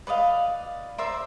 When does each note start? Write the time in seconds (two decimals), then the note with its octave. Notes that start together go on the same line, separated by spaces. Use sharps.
0.07 B4 D5 D#5 F5
0.98 A#4 C5 D5 E5